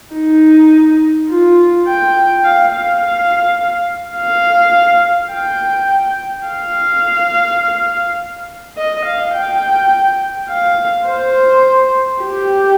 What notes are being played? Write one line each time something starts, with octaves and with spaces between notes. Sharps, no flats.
D#4
F4
G5
F5
F5
F5
G5
F5
D#5
F5
G5
F5
C5
G4